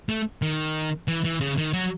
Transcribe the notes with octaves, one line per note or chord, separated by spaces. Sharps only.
A3
D#3
E3
E3
C#3
D#3
F#3